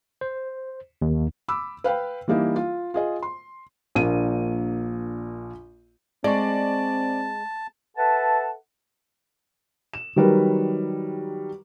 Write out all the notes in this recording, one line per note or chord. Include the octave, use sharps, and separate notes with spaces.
C5
D#2
B5 D6 E6
B4 F5 G5 B5
E3 G3 A#3 D#4 E4
F4
F4 G#4 D#5
C6
A#1 A#3 D4 D#7
G#3 C4 D5 A5 C#6
A4 B4 E5 F#5 A5
E7
D#3 F#3 G3 A#4 B4